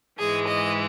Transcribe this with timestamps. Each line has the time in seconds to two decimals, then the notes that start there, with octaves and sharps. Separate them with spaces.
0.18 G#2 E3 G#3 G#4
0.47 D#5